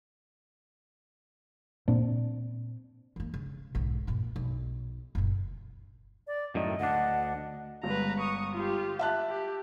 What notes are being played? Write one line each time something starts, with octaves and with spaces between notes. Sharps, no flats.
A#2 C4 D4
E3 A#3
C#3
B1 G#2
G2 A#2
B1
F#1 A#2
D5
F#2 A2 D#3 D#5
D2 D4 F#5
G1 G2 G#3 B4 A#5
C#6 D#6
F4 G4
E5 A5 F#6
G4